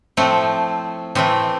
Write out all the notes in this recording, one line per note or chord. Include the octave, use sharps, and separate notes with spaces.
A2 F3 A3 C4
A2 E3 A3 C4